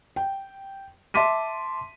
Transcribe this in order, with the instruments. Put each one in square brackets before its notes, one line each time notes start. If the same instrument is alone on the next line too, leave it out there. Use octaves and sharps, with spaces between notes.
[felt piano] G5
E5 A5 C6 D6 B6 D#7